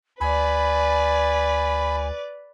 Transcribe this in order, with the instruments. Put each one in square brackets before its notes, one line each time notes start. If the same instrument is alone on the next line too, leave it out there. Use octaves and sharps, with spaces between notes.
[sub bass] D2 [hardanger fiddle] B4 D5 [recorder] G#5 [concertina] B5